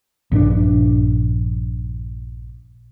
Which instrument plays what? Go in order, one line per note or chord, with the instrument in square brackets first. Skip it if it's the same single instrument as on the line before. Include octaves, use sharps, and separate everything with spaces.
[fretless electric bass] A#1 G2 E3 D4